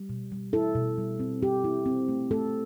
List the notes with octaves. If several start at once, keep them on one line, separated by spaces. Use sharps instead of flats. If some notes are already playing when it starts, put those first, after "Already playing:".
Already playing: G3
B2
G3
E4 A4
B2
G3
C4
C4 G4
E4
C4
A3
A3 A4